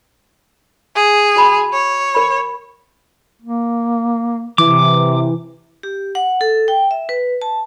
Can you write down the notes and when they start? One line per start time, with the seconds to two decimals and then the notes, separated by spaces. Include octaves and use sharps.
0.95 G#4
1.36 F#4 A5 B5
1.73 C#5
2.14 A#4 B5
3.42 A#3
4.58 C3 E3 D6
5.83 G4
6.15 F#5
6.41 A4
6.68 G5
6.91 E5
7.09 B4
7.42 A5